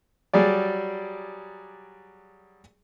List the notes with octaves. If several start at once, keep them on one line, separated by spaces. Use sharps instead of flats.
F#3 G3 G#4 D5